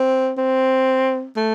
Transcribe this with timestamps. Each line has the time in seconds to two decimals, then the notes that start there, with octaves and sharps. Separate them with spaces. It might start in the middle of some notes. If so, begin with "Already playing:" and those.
Already playing: C4
0.37 C4
1.37 A3